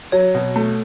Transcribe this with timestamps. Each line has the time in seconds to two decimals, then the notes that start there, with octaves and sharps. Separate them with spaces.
0.12 F#3 C#5
0.35 B2
0.56 A3